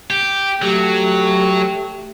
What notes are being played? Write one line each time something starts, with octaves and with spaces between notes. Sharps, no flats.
G4
F#3 A3 G4